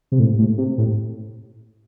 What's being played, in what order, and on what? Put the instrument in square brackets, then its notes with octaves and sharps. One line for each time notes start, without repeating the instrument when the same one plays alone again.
[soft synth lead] C3
A2
A2
C3
A2